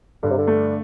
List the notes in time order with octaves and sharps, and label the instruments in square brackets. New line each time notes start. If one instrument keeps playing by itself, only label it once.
[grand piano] G2 [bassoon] D3
[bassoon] C3
D3
[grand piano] A3